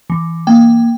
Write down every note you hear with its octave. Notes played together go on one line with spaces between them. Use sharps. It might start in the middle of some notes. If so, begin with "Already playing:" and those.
E3
A#3 G5